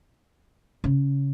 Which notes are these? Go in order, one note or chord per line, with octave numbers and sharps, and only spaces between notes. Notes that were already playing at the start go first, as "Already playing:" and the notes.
C#3